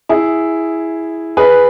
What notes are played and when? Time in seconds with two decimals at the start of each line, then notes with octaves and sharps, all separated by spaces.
0.09 E4 G#4
1.37 G#4 B4